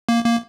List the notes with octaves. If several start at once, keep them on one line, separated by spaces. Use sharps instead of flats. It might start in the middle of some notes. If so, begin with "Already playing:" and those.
A#3
A#3